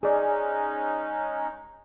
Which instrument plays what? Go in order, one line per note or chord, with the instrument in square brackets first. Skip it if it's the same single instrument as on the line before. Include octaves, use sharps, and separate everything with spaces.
[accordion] G#3 C#4 D#4 [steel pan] G#4 D5